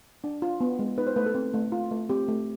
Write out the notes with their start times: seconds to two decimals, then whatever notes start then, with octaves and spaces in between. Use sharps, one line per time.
0.24 D4
0.42 F4
0.61 B3
0.79 G#3
0.98 D#4 B4
1.07 C5
1.16 A3 B4
1.26 A4
1.35 C4
1.54 A3
1.72 F4
1.91 A3
2.09 C4 G4
2.28 A3